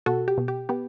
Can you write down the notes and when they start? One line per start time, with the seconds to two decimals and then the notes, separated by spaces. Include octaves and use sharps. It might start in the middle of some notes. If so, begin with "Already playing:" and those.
0.06 B2 F#4 A4
0.28 G4
0.38 B2
0.48 G4
0.69 B3 G4